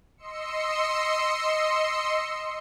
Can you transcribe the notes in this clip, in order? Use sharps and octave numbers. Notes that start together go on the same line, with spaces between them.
D#5 C6 E6 C#7